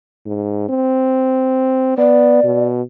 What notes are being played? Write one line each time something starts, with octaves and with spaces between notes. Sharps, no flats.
G#2
C4
B3 D5
B2